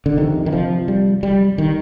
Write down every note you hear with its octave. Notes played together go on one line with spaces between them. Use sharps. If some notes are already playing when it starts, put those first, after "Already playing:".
D3
F2 C3 D#3
D#3
F3
G3
G3
D#3